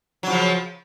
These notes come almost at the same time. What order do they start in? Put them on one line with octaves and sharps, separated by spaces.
F#3 C#3 F3